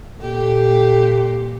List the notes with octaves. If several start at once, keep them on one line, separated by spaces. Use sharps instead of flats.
A#2 G4 A4